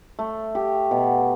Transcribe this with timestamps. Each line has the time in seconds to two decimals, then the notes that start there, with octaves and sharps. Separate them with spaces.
0.19 A3
0.55 G4
0.91 B2